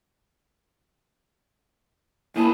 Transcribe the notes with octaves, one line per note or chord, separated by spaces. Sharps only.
F#2 A#3 E4 G#4 A5